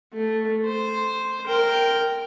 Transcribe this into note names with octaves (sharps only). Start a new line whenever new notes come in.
A3
C5
A#4 G5